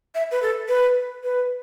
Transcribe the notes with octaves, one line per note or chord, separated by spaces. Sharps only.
E5
B4
A4
B4
B4